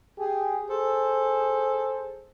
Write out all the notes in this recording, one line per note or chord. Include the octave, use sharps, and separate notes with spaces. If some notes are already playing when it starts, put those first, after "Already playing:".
G4 G#4
G#4 A4 C5